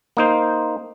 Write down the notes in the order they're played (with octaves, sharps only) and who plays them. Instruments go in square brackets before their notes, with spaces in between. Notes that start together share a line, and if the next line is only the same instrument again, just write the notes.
[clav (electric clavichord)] A#3 D#4 C5